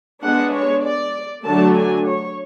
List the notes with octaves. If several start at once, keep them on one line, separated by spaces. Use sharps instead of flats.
G#3 B3 D4 F#5
C#5
D5
D3 F#3 A3 D4 A5
G#5
C#5